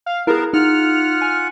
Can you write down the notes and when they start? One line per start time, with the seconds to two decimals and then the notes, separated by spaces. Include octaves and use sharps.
0.06 F5
0.27 B3 E4 G#4 A#4 F5 A5
0.53 D#4 F4 F#5 F6
1.22 G#5